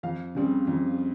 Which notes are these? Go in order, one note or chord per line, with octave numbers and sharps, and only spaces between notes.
F2 F5
C#3 G3 C4
F2